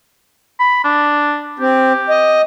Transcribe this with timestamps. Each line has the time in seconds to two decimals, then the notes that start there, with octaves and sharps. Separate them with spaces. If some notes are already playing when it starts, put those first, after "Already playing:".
0.60 B5
0.84 D4
1.60 C4 G4
2.10 D#5